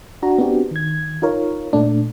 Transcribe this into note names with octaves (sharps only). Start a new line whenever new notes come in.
D4 F#4 A#5
B3 C4 D4 F#4 G4
D#3 G#6
D#4 F4 A#4 C#5
A#2 A3 D4